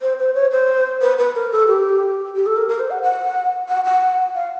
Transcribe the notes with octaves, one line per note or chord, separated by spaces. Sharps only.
C5
C5
C#5
C5
B4
B4
A#4
A4
G4
G4
A4
A#4
A#4
C5
F#5
F#5
F#5
F#5
F5